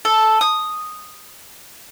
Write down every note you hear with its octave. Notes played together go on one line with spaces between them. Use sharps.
A4
D#6